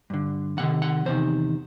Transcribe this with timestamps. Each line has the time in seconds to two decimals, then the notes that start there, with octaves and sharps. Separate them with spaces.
0.10 G2 D3
0.57 E2 C3 D#3 F#5
0.82 F#5
1.05 E2 C3 D#3 C5